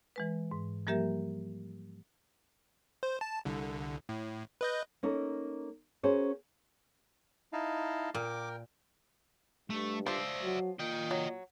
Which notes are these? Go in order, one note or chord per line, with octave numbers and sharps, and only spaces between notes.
E3 G#3 B4
G#2
F3 G3 A#3 G4 A#4 E5
C5
A5
C2 D3
A2
B4 D#5 G6
A#3 C#4 D#4 A4 A#4
C#4 F#4 G#4 A#4 C5 C#5
D#4 E4 D#5 F5 A5
A#2 A#4 G5 D6
G2 A3
F3 C5 D5 E5
F#3
A#2 D#5 G5
F#3